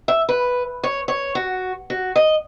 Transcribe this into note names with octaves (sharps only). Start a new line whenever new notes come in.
E5
B4
C#5
C#5
F#4
F#4
D#5